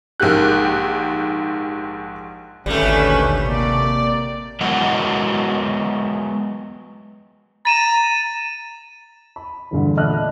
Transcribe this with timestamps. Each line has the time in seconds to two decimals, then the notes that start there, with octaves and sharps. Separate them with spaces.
0.20 A#1 G#2 A#3 G4 F#6
2.66 G#1 D2 A#2 G3 A3 C#4 B4
3.45 C3 A#3 D5
4.61 F#3 G#3 B3 F#4 A#4 D#5
7.65 A#5 A6 D#7 E7
9.36 B5
9.71 E2 G2 A#2 D3
9.97 A3 D4 D#5 B5 F6 F#6